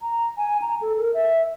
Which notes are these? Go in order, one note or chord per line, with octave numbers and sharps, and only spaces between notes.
A#5
G#5
A#5
A4
A#4
E5